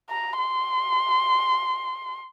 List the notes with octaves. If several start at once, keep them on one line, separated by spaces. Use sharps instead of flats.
A#5
C6